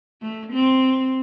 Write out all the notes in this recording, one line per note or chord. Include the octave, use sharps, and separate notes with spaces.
A3
C4